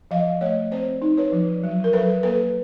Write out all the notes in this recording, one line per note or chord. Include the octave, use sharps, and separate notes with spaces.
F3 D#5 F5
A3 C#5 D#5
C4 C5 D5
D#4
B4 C#5
F3
F#3
A#4
F#3 A4 B4
A#3 A4 B4